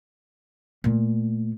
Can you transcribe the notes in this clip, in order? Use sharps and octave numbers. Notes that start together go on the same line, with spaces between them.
A#2 A3